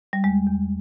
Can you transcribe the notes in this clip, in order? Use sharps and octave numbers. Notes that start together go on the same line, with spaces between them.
G3
E2 G#3
E2